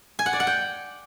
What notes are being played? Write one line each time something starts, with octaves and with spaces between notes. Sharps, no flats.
G#5
F#5
D5
F#5
G5